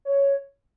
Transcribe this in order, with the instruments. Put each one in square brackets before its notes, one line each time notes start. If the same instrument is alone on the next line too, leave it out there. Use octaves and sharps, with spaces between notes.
[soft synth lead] C#5